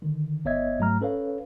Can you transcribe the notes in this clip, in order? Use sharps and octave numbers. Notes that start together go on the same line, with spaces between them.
D3 D#3
G1 B3 C#5 D#5 E5 G#6
G#2 F#3 A3 A#5 F6
C#4 A4 B4 C#5 F5